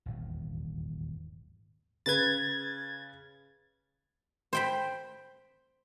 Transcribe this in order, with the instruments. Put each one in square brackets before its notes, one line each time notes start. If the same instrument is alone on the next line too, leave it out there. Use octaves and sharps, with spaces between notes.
[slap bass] D#1 G#1 E2
[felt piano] C#3 B4 [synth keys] G#6 A6
[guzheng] C5 G5 B5